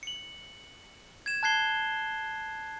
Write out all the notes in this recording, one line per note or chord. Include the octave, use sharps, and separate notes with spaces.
C#7 F#7
G#6 E7
A5 F#6 G#6 C7 G7